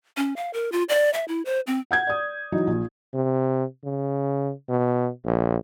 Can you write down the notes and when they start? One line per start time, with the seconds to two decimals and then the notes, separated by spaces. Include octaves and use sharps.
0.17 C#4
0.36 F5
0.53 A#4
0.72 F4
0.89 D5
1.13 E5
1.28 E4
1.45 C5
1.67 C4
1.91 F#5 G6 G#6
2.07 D5 D#6
2.52 E3 F#3 D#4
2.67 A#1
3.14 C3
3.84 C#3
4.69 B2
5.25 A#1